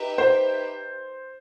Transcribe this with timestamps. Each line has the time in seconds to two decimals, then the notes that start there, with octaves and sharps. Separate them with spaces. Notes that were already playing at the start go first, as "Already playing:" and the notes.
Already playing: D#4 G4 B4 E5
0.18 C5